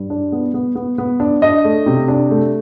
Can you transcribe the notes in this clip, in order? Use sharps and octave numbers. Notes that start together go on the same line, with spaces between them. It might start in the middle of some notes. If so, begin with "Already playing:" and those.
Already playing: G2
D4
B3
B3
B3
B3
D4
D4 D#5
A3
C3
D4
A3